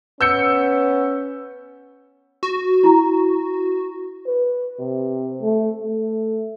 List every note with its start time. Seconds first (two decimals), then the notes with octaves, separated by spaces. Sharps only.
0.21 B3 C#4 E6 G6 C#7
2.43 F#4
2.83 E4 A#5
4.27 B4
4.79 C3
5.42 A3
5.82 A3